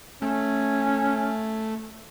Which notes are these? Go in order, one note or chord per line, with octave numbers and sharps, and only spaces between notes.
A3 C#4